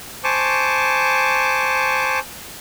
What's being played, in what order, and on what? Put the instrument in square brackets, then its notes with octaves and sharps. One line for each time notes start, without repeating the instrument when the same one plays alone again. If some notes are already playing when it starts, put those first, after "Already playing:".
[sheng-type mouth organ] C5 G#5 A5 C#6 D6